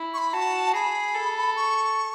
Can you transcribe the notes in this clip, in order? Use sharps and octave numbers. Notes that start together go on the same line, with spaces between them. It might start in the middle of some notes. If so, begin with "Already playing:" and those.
Already playing: E4
C#6
B5
F#4 A5
G#4 B5
A4
C#6